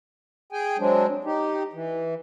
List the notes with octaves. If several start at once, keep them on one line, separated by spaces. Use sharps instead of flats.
G#4 G5 G#5
F#3 G#3 C4 D4
D#4 G4
E3